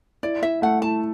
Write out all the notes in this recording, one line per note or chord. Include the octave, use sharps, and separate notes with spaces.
E4 D5
E4 E5
A3 F#5
E4 A5